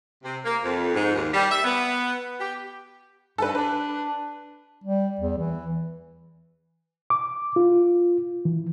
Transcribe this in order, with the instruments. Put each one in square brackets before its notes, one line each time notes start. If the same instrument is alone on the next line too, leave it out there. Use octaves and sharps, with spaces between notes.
[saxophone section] C3
A#3
F2
G#2
D#2
G3
E5
B3
G4
[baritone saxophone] G2 [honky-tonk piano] A4 B4
[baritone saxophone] D4 [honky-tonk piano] B4
[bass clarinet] G3
E2
E3
[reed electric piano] D6
F4
E3